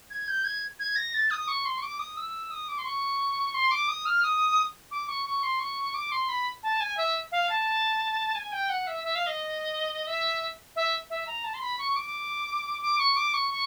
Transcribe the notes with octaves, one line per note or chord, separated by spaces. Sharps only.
G#6
G6
G#6
G#6
A#6
A6
D#6
C#6
C6
C#6
D6
D#6
E6
D#6
D6
C6
C#6
C6
D6
D#6
F6
D#6
D6
C#6
C#6
C6
C#6
D6
C6
B5
A5
G#5
E5
F5
A5
G#5
G5
F#5
E5
E5
F5
D#5
E5
E5
E5
A#5
A5
C6
B5
C#6
D6
D6
C#6
D6
C#6
C#6